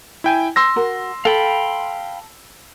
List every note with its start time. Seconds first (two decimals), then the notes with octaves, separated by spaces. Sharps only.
0.24 E4 G5 G#5
0.56 C6 E6 A#6
0.76 F#4 A#4
1.25 A4 F5 G5 B5